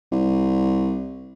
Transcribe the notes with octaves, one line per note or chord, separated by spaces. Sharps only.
C2